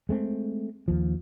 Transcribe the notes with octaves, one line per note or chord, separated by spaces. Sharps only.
G#3 A3 C4
D#2 F3